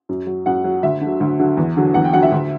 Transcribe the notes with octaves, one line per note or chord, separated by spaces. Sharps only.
F#2
F#3
F#2 F#5
F#3
D2 E5
D3
F#3
D2
D3 F#3
E2
D3 F#3
E2 F#5
G5
D3 F#3 F#5
E5
D2